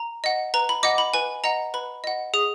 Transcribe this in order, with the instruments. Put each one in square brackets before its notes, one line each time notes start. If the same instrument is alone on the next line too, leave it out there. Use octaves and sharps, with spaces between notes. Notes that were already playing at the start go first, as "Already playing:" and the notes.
Already playing: [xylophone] A#5
D#5 F#5
B4 A#5
B5
D#5 F#5 D6
B5
B4 G#5
D#5 F#5 A#5
B4 B5
D#5 F#5
G#4 D#6